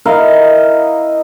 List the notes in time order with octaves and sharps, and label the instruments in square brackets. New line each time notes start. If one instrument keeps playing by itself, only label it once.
[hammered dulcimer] E4 A#4 D#5 F5